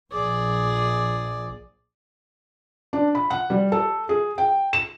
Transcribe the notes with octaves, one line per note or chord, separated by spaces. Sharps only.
A#1 G#4 D5
D4
B5
F#5
G3
A4
G#4
G5
E7